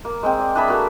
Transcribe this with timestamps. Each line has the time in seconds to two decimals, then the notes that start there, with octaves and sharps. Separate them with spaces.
0.05 A#3
0.23 G#3 C4 G5
0.39 D5
0.55 D4 G#4 E5 B5
0.68 A#3 F#4 A4